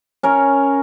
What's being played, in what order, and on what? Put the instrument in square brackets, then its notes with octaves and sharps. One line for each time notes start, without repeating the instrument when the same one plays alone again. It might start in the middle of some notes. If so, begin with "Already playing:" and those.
[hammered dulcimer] C#4 A#4 C#5